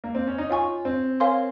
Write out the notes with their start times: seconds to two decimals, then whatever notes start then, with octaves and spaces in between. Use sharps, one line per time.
0.04 A#3
0.15 C4
0.27 C#4
0.38 D#4
0.50 F4 C#5 G#5 C#6
0.85 C4
1.20 A#4 C#5 F5 G#5 C6